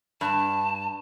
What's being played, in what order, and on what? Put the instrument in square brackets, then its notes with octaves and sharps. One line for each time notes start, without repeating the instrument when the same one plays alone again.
[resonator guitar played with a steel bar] G2 [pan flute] A5